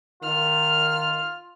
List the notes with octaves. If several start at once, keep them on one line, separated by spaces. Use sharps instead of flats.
D#3 F4 F6